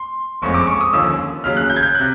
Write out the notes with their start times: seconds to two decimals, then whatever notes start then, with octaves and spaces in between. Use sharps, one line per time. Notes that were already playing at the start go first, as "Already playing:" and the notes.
Already playing: C6
0.42 F#1 F2 C#3 F3 G#3 C#6
0.54 D6
0.67 C#6
0.81 D#6
0.93 D#2 D3 F3 A#3 C#4 E6
1.44 D#2 C#3 F#3 F6
1.57 F#6
1.70 G6
1.76 G#6
1.83 G6
1.95 C3 F#6